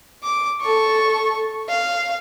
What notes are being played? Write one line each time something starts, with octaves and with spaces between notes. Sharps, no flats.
D6
A4 C#6
F5